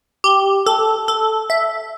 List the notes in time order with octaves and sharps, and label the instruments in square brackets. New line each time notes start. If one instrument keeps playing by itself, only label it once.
[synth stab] G4
A4
A4
E5